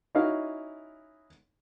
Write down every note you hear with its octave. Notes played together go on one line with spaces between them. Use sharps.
C#4 D#4 E4 F#4 F5